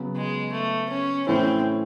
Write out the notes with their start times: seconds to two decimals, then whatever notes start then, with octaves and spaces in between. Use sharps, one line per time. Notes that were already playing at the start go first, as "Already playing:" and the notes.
Already playing: C#3 F#3 B3
0.16 G#3
0.53 A3
0.90 C#4
1.27 A2 E3 A3 C4 C#4 E4